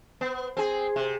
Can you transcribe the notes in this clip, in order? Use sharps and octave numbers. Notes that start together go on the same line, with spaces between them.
B3
C4 G#4
C3